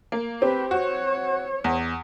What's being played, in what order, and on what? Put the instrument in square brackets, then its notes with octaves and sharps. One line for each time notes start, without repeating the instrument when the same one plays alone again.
[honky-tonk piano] A#3
[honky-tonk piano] C4 [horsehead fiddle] G4 B4
[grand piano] F#4 [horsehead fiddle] C#5
[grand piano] E2